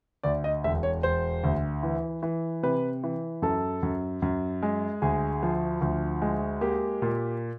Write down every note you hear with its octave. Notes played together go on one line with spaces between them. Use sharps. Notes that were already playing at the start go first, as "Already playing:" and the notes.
D2 D5
D#5
E1 E5
C#5
E1 C5
D2
E3
E3
C3 B4
E3
F#2 A4
F#2
F#2
G#3
D2 G#4
F3
D2
G#3
A#3 G4
A#2